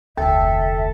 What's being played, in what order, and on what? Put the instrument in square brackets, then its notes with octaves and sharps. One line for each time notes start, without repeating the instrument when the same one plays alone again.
[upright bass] F1 D2 [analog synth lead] A4 [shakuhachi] E5 [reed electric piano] G5